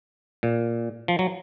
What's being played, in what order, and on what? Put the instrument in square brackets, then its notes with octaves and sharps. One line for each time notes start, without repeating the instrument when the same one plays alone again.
[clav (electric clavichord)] A#2
F3
F#3